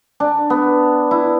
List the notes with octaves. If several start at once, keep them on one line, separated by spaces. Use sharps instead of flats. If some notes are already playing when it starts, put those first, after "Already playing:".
D4
B3
E4